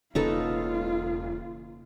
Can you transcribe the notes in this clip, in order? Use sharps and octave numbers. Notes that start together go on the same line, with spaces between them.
E1 C#3 A#3 C#4 D#4 F4 A4 B4